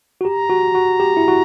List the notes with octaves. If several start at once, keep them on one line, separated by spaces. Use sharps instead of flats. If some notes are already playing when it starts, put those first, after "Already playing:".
F#4
G4 A#5
F#4
F#4
G4
E4
F#4